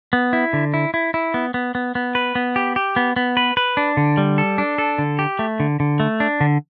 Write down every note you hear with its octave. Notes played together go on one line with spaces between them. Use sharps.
B3
E4
D3
E4
E4
E4
B3
B3
B3
B3
B4
B3
G4
G4
B3
B3
B4
B4
D4
D3
G3
A4
D4
A4
D3
G4
A3
D3
D3
A3
D4
D3